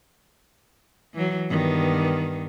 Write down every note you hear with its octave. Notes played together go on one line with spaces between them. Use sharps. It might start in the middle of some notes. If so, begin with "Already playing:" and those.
E3 F#3
G2 D#3 B3